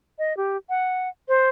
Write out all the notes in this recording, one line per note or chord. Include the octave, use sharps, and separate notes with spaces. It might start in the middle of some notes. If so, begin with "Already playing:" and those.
D#5
G4
F#5
C5